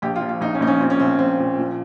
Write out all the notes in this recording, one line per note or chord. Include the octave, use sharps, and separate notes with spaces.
A#1 G4
F4
F3
F4
A#1 D#4
C#4
A#1 D#4
C#4
A#2 C4
C#4
A#1 C4
A#1 C4
A#2
F3